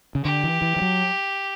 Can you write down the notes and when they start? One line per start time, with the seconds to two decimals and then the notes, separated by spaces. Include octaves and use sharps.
0.15 C#3
0.24 D3 G4
0.44 E3
0.62 E3
0.76 E3
0.82 F#3